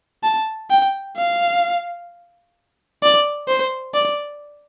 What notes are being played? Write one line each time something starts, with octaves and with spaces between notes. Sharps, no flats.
A5
G5
F5
D5
C5
D5